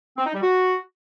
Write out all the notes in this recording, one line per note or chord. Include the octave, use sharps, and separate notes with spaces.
C4
D#4
G3
F#4